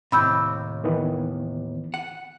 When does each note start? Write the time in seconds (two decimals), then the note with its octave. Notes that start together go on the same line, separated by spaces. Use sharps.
0.12 D#2 A2 C3 B5 E6 G6
0.84 D#3 E3 B3
1.94 F#5